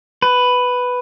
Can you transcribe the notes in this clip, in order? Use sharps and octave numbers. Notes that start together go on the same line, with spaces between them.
B4